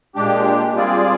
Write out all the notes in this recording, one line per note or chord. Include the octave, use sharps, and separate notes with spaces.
A#2 G#3 D4 G4
G3 C4 F4 G#4 D5